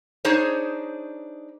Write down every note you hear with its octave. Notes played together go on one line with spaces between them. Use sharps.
D4 D#4 G#4 C5 C#5